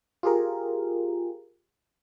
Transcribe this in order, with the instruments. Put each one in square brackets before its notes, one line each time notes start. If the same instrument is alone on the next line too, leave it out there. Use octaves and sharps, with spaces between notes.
[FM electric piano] F4 G4 G#4 A#4